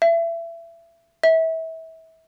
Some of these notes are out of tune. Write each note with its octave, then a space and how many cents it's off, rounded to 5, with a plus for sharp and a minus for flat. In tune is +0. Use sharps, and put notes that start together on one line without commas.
E5 +25
E5 -30